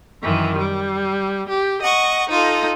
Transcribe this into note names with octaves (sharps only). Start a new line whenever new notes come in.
F#2 D#3 E3
G3
G4
D#5 F#5 C#6
D#4 F4 A4